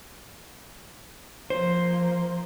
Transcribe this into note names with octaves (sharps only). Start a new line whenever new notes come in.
F3 A#3 C5